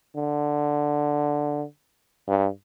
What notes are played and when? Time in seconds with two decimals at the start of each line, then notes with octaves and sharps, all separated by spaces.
0.16 D3
2.28 G2